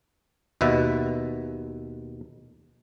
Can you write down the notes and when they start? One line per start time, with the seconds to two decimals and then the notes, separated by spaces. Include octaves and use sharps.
0.61 D#2 B2 B4 E5